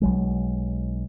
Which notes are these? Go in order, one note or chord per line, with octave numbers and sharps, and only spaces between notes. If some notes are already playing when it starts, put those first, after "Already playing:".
B1 F#3 G#3